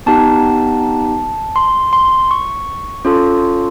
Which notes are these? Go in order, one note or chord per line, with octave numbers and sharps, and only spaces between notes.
B3 D#4 G4 A5
C6
C6
C#6
C#4 F4 A4